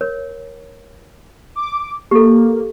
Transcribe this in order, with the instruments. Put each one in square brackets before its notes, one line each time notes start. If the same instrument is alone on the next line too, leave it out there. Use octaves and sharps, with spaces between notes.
[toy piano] A#4 C#5
[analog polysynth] D6
[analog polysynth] A#3 [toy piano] G4 A4